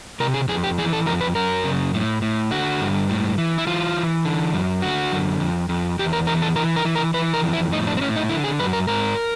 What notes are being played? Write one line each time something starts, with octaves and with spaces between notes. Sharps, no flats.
C3 A#4
G#4
F2 G#4
G4
E3 G#4
A4
F2 A#4
B4
F#2 A#4
C#3
A2
A2
D3 F#4
G2
A2
E3
E4
E3 F4
E3
D3
F#2
D3 F#4
F#2
F2
F2
E2 G4
A#4
E3 A#4
A4
E3 A#4
A#4
E3
A#4
E3 B4
A#4
F2
E4
A2 D#4
D4
C4
A2 C#4
D#4
D3 E4
G#4
F#2 B4
A#4
G#2 A#4